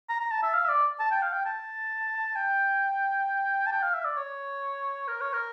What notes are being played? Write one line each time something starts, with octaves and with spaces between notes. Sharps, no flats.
A#5
A#5
A5
E5
F5
E5
D5
A5
G5
F5
G5
A5
G5
A5
G5
F5
E5
D5
C#5
A#4
C#5
A#4